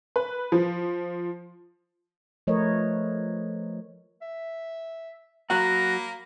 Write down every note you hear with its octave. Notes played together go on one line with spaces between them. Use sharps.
B4
F3
F3 A3 A#4 B4 C#5 D#5
E5
F#3 A#3 F#4 F#5 A#5 B5